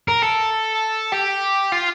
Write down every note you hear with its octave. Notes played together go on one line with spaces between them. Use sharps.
A#4
A4
G4
F4